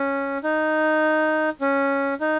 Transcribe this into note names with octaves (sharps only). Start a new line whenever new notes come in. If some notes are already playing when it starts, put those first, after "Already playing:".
Already playing: C#4
D#4
C#4
D#4